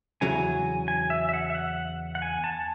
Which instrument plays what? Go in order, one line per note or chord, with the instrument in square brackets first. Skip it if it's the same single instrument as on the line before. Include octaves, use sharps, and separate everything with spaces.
[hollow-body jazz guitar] E2 C#3 F#3 [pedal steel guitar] G#5
[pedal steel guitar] G#5
E5
E5
F#5
E5
F#5
F#5
G#5
A5